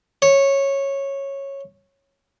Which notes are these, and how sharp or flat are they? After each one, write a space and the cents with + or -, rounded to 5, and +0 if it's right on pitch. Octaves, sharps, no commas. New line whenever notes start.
C#5 -10